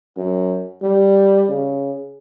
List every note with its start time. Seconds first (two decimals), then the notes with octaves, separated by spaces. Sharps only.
0.17 F#2
0.82 G3
1.49 C#3